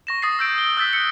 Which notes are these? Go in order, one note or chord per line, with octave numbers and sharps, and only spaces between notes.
C#6 A#6 E7
D#6 A6 C7
E6 G6 D7
G7
E6 F#6 A6 B6
C#7